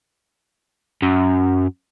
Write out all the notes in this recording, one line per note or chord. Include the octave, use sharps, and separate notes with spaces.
F#2